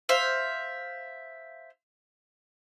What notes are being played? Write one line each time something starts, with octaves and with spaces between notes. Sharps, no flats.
C5 E5 F5